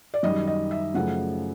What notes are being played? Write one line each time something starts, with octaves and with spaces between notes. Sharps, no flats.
D5
F#2 D#3 G3 D#5
D#5
E5
F#2 C#3 F3 A3 F#5